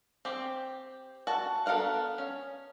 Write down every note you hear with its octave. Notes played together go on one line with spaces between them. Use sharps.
C4 G4
F#4 A5
B3 A4 A#4 F5 F#5
C#4